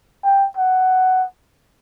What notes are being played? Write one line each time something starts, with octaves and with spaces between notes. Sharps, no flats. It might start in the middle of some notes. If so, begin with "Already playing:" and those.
G5
F#5